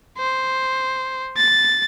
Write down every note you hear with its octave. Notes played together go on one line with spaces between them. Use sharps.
C5
A6